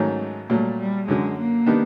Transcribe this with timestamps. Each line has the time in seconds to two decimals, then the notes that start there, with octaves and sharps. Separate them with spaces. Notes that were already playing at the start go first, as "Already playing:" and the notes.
Already playing: G#2 D#3 F#3 A3 C#4
0.20 G#3
0.50 A#2 F#3 G3 A3
0.79 G3
1.08 F#2 D3 F#3 G#3
1.38 A#3
1.66 D#3 G3 B3 D4